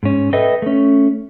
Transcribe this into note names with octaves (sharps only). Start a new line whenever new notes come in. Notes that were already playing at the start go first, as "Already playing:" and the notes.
G#2 C#4
A4 B4 D#5 E5 G5
A3 C#4